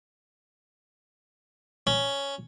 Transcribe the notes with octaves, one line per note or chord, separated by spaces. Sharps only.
C#4